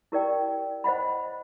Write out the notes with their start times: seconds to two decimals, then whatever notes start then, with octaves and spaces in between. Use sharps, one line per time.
0.12 E4 G4 A#4 D5 G5
0.84 C5 D#5 F#5 B5